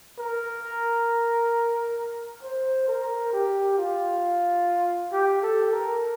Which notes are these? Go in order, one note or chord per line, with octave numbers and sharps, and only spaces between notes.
A#4
C5
A#4
G4
F4
G4
A4
A#4